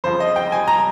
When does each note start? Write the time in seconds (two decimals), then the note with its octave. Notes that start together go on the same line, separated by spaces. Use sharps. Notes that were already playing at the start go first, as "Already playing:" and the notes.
0.04 F2 C#3 F3 C5
0.20 D#5
0.36 G5
0.52 G#5
0.68 A#5